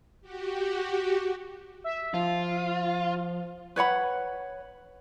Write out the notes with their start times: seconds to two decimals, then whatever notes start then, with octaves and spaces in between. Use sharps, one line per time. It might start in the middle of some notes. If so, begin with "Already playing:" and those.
0.21 F#4 G4
1.84 E5
2.14 F3 F4
3.76 B4 C#5 F#5 B5